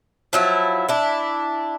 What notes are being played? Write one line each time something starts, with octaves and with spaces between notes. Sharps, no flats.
F3 F#3 E4
D4 E4